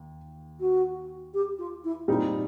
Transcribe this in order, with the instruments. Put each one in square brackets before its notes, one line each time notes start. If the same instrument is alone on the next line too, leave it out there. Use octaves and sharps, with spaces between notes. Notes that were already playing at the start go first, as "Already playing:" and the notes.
Already playing: [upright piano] D#2
[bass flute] F#4
G4
F4
E4
[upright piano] A#2 G3 C4 D#4 [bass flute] E4